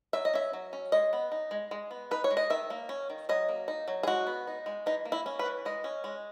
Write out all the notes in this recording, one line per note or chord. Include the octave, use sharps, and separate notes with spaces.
F#3 E5
D#5
C#4 E5
F#3
C#4
G#3 D#5
B3
D#4
G#3
G#3
B3
D#4 B4
C#5
G#3
D#5
D#3 E5
A#3
C#4
D#3
F#3 D#5
A#3
D#4
F#3
G#4
G#3 F#4
B3
D#4
G#3
E3 D#4
A#3
E4
C#4
B4
E3
G#3 D#5
C#4
G#3